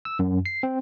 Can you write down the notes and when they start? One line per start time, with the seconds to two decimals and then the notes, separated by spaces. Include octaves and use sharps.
0.05 E6
0.19 F#2
0.46 C7
0.63 C4